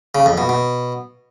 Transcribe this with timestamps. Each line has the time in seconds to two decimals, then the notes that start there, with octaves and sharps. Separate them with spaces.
0.15 C#3
0.26 F2
0.38 B2
0.49 B2